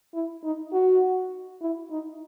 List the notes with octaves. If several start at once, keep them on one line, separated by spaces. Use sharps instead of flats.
E4
D#4
F#4
E4
D#4